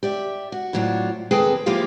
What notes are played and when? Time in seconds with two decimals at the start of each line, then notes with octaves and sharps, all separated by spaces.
0.03 G4 D5 E5
0.52 F#4
0.73 F2 A2 F#3 D4 F4
1.31 D#2 C4 G#4 A4 B4 G5
1.66 F3 A#3 E4 F4 G4 F5